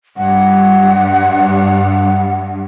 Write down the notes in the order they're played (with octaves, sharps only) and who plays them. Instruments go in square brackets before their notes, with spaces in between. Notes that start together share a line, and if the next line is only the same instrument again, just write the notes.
[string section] G2 [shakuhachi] F#5